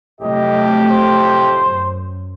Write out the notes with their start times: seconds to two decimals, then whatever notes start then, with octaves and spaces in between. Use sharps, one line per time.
0.21 F2 A2 C3 F#3 A3 G4 D#5
0.91 C5
1.62 F#2